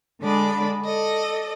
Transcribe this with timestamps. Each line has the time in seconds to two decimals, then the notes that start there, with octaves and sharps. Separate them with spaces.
0.20 D3 G#3 D4 D5 B5
0.85 A4 D5 D#5